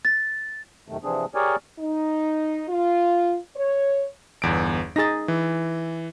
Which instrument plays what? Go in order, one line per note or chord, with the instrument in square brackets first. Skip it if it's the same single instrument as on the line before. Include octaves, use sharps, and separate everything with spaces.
[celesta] A6
[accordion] F#2 C3 D#3 A3
C3 E3 F3 C4 D4 G#4
G4 G#4 A#4 C#5 D5 G#5
[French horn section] D#4
F4
C#5
[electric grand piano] G1 E2 D7
[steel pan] D#4 G#4 [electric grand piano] A6 A#6
[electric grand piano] E3